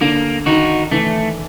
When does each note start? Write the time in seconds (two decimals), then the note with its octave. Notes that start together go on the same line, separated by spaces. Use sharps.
0.01 D3 A#3
0.46 D#3 D#4 F#4
0.91 E3 A3